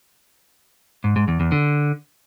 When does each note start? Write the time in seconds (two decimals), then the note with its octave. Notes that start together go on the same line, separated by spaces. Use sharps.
1.04 G#2
1.16 G#2
1.28 E2
1.40 E2
1.52 D3